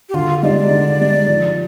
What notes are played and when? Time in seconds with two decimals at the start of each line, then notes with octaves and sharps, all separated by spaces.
0.09 G4
0.14 D3 F4
0.43 G#3 D#4 G4 D5
0.71 D3
0.99 G#3 D#4 G4
1.28 F3